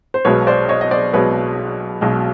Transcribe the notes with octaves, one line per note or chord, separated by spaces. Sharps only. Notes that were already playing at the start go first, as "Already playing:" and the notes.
C5
B1 B2 G#3 B4 C#5
C5 D5
C#5 D#5
D#5
C5 D5
B1 B2 G#3 B4 C#5
B1 B2 G#3